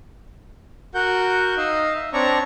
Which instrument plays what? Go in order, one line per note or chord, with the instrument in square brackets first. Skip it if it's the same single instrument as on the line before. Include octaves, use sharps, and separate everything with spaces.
[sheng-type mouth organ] F#4 A#4 F#5 G6
D#4 D#5 F5 E6
E5
C4 D4 C#5 D5 A#5 C#6